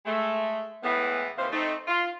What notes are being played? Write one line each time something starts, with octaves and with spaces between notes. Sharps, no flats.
G#3 A3
E2 A2 E3 G#3 B3
D#2 C3 E3 A#3 C5 F5
A3 C4 D#4
F4